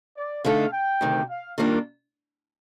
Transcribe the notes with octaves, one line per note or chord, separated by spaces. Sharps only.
D5
D3 A3 D#4 A4 F5
G5
D2 C3 D#3
F5
D#3 G3 A#3 D4 F4